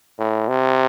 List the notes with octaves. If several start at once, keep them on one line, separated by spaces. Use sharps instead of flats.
A2
C3